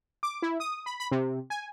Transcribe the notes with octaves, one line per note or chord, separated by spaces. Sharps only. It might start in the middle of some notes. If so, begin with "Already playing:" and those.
D6
E4
D#6
B5
B5
C3
G#5